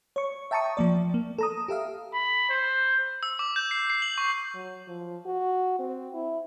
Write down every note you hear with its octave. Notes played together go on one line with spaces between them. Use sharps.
C#5 C#6
E5 G5 A5 A#5 C#6 D#6
F3 A#3 D5
A#3
A4 A#5 D#6
G4 A4 E5 F5
B5
C5
E6
D6
G6
C7
C7
F#7
C#6
F#3
F3
F#4
C4
E4